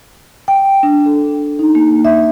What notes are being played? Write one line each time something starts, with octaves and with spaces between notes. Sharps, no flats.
G5
D4
A4
D#4
A#3
E5